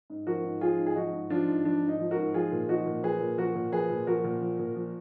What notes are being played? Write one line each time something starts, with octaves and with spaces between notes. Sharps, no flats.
G#2
F3 F#4 A#4
G#2
F3 F4 G#4
G#2
G#4
F3 D#4 F#4
G#2
F3 D4 F4
G#2
F3 D4
G#2
D#4
F3
F#4 A#4
G#2
F3 F4 G#4
A#2
F3 D#4 F#4
A#2
F3 G#4 B4
A#2
F3 F#4 A#4
A#2
F3 G#4 B4
A#2
F3 F#4 A#4
A#2
F3
A#2
F3